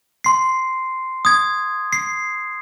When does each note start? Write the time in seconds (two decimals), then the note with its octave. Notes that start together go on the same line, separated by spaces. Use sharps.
0.24 C6 C7
1.25 D#6 G#6
1.93 C7